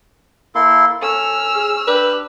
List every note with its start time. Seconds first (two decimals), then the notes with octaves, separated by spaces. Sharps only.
0.55 A#3 E4 A4 C6
1.02 C#4 A4 E6 F6
1.55 G#4
1.87 D4 G4 B4